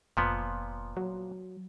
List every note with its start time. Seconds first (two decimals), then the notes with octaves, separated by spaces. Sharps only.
0.17 F1 A#2 F3 B3
0.97 F#3